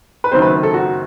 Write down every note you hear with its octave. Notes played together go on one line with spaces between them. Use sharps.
B4
F#1 F#2 D#3 F#3 C4 C5
B4
A4
F#4